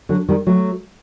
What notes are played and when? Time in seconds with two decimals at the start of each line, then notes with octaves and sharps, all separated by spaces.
0.09 D3 F#3
0.29 D#3 G3
0.47 F#3 A3